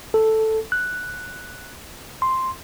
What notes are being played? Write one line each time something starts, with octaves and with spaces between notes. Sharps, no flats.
A4
F#6
C6